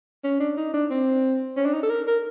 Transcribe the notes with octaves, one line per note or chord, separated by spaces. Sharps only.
C#4
D4
D#4
D4
C4
C#4
D4
D#4
A4
A#4
A#4